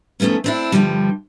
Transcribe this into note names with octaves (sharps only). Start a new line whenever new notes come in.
F2 G#2 A3 B3 C#4
C4 D4 E4
G2 A#2 D3 F3 G3